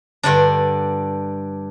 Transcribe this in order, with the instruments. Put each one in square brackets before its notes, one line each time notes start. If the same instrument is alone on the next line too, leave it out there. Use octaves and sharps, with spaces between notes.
[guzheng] G2 D3 D4